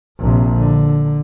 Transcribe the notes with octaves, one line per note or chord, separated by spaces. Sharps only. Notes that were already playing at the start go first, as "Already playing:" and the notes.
A#1 C3
D3